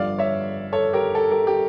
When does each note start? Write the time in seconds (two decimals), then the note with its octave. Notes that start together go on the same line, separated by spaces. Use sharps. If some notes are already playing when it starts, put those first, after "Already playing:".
Already playing: G1 G2 D3 F3 D5 F5
0.18 C#5 E5
0.73 A4 C#5
0.93 G4 A#4
1.15 A4
1.30 G4 A#4
1.47 G4